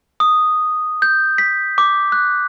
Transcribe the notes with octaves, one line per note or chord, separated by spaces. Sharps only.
D#6
G6
B6
D6
F#6